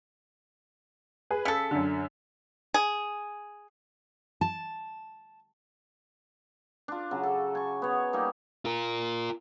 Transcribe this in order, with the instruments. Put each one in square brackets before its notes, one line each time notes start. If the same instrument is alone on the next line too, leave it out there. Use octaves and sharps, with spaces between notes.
[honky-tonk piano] G#4 B4
[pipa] C#3 A4 [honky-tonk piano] B6 C#7
[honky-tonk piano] F#2 D3
[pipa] G#4
[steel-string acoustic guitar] A5
[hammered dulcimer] D4 F4
C#3 F#3
A4
G#5 C#6
B3 C#5
G3 A#3 D#4
[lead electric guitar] F4 A#4